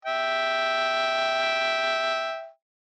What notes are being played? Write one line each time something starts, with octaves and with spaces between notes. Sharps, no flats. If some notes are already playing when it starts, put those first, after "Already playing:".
E5 G5